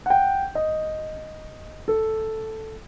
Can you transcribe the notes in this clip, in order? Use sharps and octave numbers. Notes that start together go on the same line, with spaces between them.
F#5 G5
D#5
A4